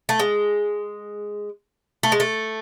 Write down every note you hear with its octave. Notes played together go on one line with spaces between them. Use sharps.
A3
G#3
A3
G#3
A3